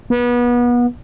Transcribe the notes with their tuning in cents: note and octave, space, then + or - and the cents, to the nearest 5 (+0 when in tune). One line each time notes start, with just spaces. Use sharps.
B3 -30